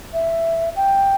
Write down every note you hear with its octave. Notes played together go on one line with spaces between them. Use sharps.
E5
G5